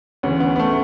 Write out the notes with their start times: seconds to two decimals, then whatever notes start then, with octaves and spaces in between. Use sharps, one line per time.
0.23 D2 C#3 E3 C#4
0.40 B3
0.56 B3
0.59 A3